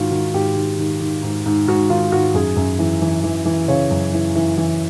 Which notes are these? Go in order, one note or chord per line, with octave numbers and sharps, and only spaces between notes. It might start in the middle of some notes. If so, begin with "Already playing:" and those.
Already playing: G#2 D#3 F4 F#4
D#3 F#4
G#2 G4
D#3
D#3
D#3
G#2
G#2
G#2 F#4
D#3 F4
G#2 F#4
F#2 G#4
F#2
E3
E3
E3
E3
C#3 C#5
F#2
E3
E3
E3